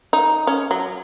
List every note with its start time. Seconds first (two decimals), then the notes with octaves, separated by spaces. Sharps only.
0.13 D#4
0.47 C#4
0.71 F#3